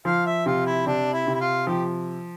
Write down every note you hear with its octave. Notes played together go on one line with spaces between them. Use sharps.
F3 F5
E5
C3 F4
E4
C3 D4
E4
C3
E4
F4
F3 G4